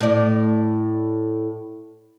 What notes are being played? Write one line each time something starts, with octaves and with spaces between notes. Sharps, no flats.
A2 D5